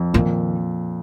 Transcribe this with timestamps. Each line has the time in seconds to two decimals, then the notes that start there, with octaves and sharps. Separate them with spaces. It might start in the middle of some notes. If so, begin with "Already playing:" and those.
Already playing: F2
0.14 A#2 D#3